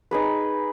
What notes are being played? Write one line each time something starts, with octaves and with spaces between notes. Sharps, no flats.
D#4 G#4 B4